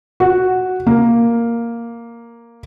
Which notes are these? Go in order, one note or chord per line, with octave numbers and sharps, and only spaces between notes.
F#4
A#3